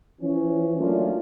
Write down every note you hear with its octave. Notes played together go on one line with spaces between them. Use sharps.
E3 F3 C#4
F#3 A3 A#3 C#4 D4 F4